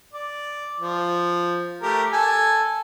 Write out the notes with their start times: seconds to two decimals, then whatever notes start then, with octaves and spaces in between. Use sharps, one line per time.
0.14 D5
0.80 F3
1.82 A3 G4 A#4
2.13 A4 G#5